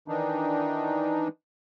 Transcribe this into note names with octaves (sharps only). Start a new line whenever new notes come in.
D#3 E3 D4 D#4